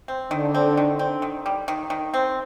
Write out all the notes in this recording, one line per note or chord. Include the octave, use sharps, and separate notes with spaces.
C4
D3 D#3
C4
D#3
C4
D#3
G3
D#3
D#3
C4